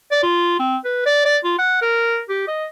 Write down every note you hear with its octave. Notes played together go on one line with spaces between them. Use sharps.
D5
F4
C4
B4
D5
D5
F4
F#5
A#4
G4
D#5